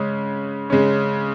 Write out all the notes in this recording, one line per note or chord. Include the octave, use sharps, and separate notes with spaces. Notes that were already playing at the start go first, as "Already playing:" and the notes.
Already playing: C#3 G#3 C#4
C#3 G#3 C#4